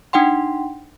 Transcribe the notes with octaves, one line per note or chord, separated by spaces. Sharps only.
D4 D#4 F#5 G5 C6